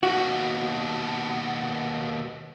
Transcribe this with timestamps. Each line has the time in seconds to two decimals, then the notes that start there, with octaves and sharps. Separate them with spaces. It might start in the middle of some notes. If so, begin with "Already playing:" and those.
0.03 D#2 B2 F#4